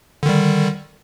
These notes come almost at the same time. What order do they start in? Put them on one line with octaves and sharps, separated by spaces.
D3 D#3 G3